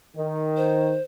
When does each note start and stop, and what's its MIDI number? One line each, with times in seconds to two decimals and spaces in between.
0.16 0.97 51
0.57 1.02 72